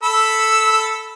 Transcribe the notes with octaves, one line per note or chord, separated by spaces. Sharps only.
A4 B5 E6